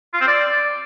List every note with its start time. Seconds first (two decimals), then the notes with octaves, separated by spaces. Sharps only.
0.14 F4
0.21 C4
0.28 D5